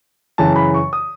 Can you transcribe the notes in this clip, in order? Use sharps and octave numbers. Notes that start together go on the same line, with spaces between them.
F#2 C#3 E3 A5
B5
C#6
D#6